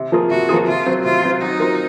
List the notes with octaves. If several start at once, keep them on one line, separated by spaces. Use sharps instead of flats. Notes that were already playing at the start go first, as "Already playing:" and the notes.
Already playing: C3
F3 A#3 F4 G#4
C3 F#4
F3 A#3 F4 G#4
C3 F4
F#3 C4
C3 F4
F#3 C4
F#3 D#4
C4 F4 A#4